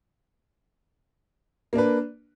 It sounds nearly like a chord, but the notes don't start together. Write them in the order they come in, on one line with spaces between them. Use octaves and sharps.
A#3 D4 B4